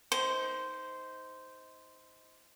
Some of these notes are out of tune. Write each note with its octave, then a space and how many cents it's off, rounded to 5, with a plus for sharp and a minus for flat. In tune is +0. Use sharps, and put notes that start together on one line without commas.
D#4 +25 C5 -10